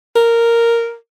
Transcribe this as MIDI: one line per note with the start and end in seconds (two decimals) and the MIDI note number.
0.16 0.95 70